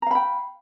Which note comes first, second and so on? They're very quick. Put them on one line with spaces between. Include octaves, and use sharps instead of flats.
A#5 F5 B5 G5